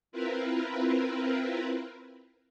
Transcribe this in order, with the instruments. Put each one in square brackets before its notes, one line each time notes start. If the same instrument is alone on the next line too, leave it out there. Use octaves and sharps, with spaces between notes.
[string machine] C4 E4 F4 A#4 B4